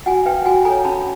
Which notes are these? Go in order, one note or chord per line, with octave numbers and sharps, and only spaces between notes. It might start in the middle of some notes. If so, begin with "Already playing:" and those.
F#4 F#5 G#5
B4 F5 G5
F#4 F#5 G#5
A4 C#5 G#5 A#5
C#4 A5 B5